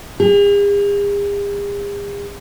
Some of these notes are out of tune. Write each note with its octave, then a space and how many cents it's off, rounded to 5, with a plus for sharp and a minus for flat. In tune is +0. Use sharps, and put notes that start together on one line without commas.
G#4 -45